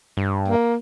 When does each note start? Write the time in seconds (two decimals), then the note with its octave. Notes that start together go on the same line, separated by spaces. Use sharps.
0.17 G2
0.48 A#3